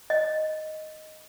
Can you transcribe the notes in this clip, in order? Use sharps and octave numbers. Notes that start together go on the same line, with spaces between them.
D#5